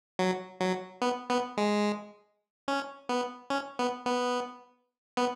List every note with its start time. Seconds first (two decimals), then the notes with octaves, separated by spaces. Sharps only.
0.19 F#3
0.61 F#3
1.02 B3
1.30 B3
1.57 G#3
2.68 C#4
3.09 B3
3.50 C#4
3.79 B3
4.06 B3
5.17 B3